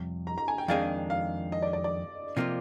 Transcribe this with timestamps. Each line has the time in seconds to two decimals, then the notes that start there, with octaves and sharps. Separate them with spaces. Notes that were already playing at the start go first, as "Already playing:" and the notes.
Already playing: F2 C3 G3
0.27 A#5
0.38 A#5
0.48 G#5
0.58 G5
0.68 F2 D#3 G#3 D4 G#4 F5
1.10 F5
1.52 D#5
1.62 D5
1.73 D5
1.84 D5
2.37 C3 F3 A#3 F4